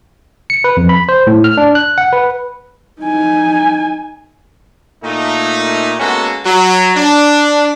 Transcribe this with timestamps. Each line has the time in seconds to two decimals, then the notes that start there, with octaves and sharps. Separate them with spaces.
0.50 C#7
0.64 B4
0.77 F2
0.89 B5
1.09 C5
1.27 A2
1.44 F6
1.57 D4
1.75 F#6
1.98 F#5
2.13 B4
3.01 D#4 G#5
5.03 A#2 A3 D#4
5.99 G#3 A#3 B3 C#4 F#4 A4
6.45 F#3
6.95 D4